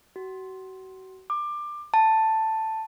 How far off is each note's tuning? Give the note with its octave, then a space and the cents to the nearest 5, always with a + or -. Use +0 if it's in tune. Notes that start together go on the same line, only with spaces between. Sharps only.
F#4 +35
D6 +20
A5 +5